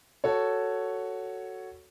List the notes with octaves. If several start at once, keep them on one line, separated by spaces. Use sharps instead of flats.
F#4 A4 C#5